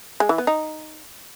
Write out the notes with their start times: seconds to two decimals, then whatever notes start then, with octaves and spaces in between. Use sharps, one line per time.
0.20 G#3
0.29 E3
0.38 B3
0.47 D#4